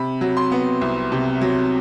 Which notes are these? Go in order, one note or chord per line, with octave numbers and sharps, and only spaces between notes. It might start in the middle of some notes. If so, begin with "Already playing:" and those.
Already playing: C3 B5
F#3
C6
B3
C2
C3
F#3